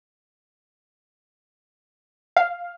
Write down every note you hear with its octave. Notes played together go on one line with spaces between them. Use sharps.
F5